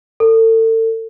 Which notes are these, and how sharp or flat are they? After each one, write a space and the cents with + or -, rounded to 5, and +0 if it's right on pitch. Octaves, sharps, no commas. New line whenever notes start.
A4 +35